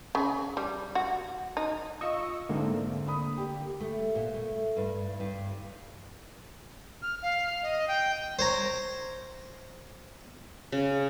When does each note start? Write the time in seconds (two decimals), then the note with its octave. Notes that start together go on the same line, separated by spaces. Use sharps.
0.15 C#3
0.57 G3
0.95 F#4
1.57 D#4
2.01 F4 D#5 F5 C#6 E6
2.49 G#2 D3 A3 A#3 C4
3.07 B5 D#6
3.38 G4
3.80 A3
4.15 A#2
4.34 A3
4.77 G2
5.20 G2
7.02 F6
7.22 F5
7.63 D#5
7.88 G5
8.39 C5 C#5 A#5
10.72 C#3